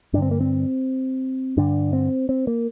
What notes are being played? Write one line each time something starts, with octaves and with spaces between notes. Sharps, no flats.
G2 D3 C4 D4
A#3
C4
G2 D3 D4
C4
C4
A#3